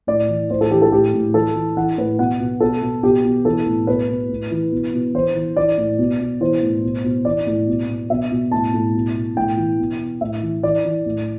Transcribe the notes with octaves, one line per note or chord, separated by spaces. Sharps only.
A2 D5
E3
A2 C5
A4
E3 G4
A4
A2 G4
A2
E3 A4
E3
E3 F#5
A2 B4
B2 F#5
B2
B2 A4
B2
B2 G4
B2
E3 A4
A2
B2 B4
B2
A2
E3
B2
B2
E3 C5
E3
E3 D5
A2
B2
B2
E3 C5
A2
B2
B2
E3 D5
A2
B2
B2
B2 E5
B2
A2 A5
A2
B2
B2
A2 G5
E3
B2
B2
A2 E5
E3
E3 D5
E3
A2